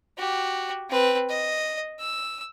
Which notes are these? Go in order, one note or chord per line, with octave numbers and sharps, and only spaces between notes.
F#4 G4
C4 B4
D#5
E6